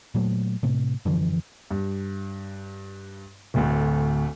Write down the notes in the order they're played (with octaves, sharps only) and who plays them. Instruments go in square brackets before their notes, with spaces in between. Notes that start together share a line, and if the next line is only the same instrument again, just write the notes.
[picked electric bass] A#2 F#3 A3
A2 C3
F#2 D3 E3 F3
[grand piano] G2
D1 D2 A3